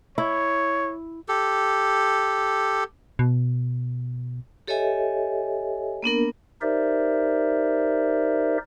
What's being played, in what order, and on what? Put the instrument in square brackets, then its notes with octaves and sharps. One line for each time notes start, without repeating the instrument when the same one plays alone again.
[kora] E4 [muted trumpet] C#5
[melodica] G4 A4
[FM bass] B2
[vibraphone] G4 A4 C#5 D#5 E5 G#5
A#3 B3 D4 A#4
[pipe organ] D#4 G4 A#4 C5 D5 E5